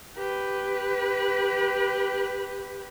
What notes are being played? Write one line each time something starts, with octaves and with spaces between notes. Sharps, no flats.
G4 B4